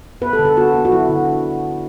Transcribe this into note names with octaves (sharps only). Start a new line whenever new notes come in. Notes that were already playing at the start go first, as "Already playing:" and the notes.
B3 B4
A4
D3
A4
B3 F#4
B3
F#4
F#3 E4
D3